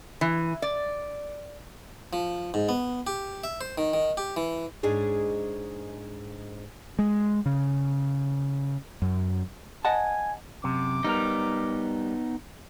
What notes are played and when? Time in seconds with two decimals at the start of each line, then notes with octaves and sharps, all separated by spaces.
0.21 E3
0.62 D5
2.13 F3
2.54 G#2
2.69 B3
3.07 G4
3.44 E5
3.61 C5
3.78 D#3
3.93 D#3
4.17 G4
4.37 E3
4.83 G#2 G#3 D4 G#4 C#5
6.99 G#3
7.46 C#3
9.02 F#2
9.85 D#5 F#5 G#5 A5
10.64 F#2 C3 D6
11.04 G3 B3 D#4 A#4